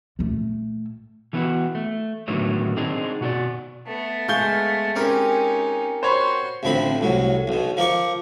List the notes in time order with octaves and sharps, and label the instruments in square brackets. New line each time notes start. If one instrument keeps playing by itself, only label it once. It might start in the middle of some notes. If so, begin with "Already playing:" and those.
[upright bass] A#2 A3
[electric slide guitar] E3 A3 B3 C#4 E4 F#4
A3
A2 D3 D#3 F#3 A3 B3
C4 D4 D#4 G#4
B2 F#4 A4 D5
[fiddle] A3 B3
[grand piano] G#3 G6 G7 [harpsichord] F5 C6 C#6
[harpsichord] C4 G4 A#4 [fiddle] C#4 D#4
[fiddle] F#4 C6 [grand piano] C5 C#5 B5
[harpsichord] A1 D2 F3 C4 B5
C2 A2 F#3
B1 B2
F3 A#4 D5 C#6